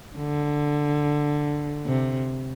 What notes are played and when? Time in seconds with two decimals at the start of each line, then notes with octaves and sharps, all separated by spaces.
0.17 D3
1.86 C3